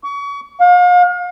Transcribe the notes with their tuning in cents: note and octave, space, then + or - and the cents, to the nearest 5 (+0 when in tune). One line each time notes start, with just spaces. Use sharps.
C#6 +35
F5 +40